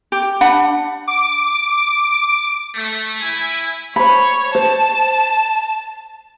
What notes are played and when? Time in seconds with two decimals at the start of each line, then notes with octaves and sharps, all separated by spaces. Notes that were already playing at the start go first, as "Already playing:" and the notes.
0.12 G4
0.41 D4 F#5 B5
1.08 D6 D7
2.75 A3
3.22 E4 G#5
3.96 C5 C#5 B5
4.55 C5 A5